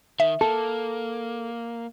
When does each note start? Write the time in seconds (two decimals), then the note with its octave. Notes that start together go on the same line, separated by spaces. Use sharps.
0.20 D#3 E5
0.41 A#3 A4